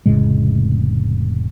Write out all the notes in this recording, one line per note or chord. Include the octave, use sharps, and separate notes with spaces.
F1 A2 C#3 G#3